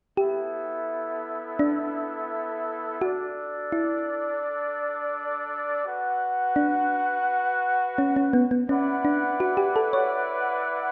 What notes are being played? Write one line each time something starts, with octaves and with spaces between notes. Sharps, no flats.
B3 E4 G4 A4 E5
D4
D4 F#4 A4 D5
E4
F#4 B4 F#5
D4
C#4
C#4
B3
B3
C#4 E4 B4 D5 F#5
D4
F#4
G4
A4
C#5